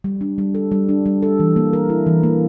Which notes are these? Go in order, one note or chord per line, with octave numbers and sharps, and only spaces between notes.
G3
D4
G3
A4
G3
D4
G3
A4
E3
A#3
A#4
E4
E3
A#3